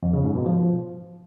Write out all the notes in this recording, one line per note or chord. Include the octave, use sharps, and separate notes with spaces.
F2
C#3
G#2
B2
F3